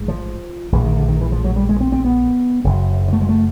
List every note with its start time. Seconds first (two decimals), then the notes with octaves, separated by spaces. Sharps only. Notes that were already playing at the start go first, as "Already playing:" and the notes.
Already playing: A1 G#2
0.08 F3
0.72 A#1 A2 E3
0.84 D#3
0.97 D3
1.08 D#3
1.21 E3
1.32 F3
1.44 F#3
1.56 G3
1.69 G#3
1.80 C4
1.92 C4
2.04 B3
2.64 F#1 F#2 C#3
3.13 A3
3.21 G#3
3.29 A3